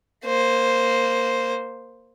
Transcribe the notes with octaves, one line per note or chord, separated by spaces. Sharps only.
A#3 C5